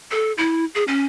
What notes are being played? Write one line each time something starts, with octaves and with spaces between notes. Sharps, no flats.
A4
E4
G#4
C#4